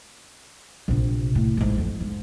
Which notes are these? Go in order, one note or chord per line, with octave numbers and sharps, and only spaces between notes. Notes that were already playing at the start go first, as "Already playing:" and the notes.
A#1 C3
A2
A1 G#2
F2
G#2